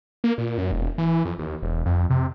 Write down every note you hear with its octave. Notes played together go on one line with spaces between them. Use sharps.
A#3
A#2
F#2
E1
E3
F2
D#2
E1
F2
C3